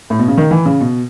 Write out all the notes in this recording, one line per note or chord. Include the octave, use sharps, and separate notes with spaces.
A2
B2
C#3
D#3
E3
C#3
B2